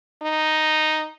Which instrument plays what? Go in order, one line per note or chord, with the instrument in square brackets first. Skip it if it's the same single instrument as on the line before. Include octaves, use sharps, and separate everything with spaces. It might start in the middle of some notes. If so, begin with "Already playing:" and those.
[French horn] D#4